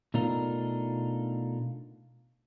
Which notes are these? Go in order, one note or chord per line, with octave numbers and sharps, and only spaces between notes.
B2 A3 D4 D#4 F4 A#4